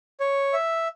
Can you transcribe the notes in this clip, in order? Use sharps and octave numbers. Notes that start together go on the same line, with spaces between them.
C#5
E5